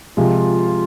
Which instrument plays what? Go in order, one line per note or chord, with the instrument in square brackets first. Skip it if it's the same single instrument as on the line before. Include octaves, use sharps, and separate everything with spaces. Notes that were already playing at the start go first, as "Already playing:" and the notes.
[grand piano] C3 F3 G#3 [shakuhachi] F4